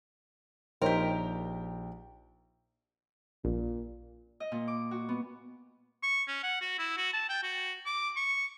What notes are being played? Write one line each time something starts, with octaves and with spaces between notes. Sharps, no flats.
A#1 D#4 G4 A#4 C5 C#5 G5
A#1 A#2
D#5
A#2
D6
F#4
B3
C#6
C#4
F#5
F#4
E4
F#4
A5
G5
F#4
D6
C#6